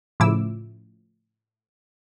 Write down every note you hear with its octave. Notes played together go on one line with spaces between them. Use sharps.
A2 C#3 F3 E4 D6 E6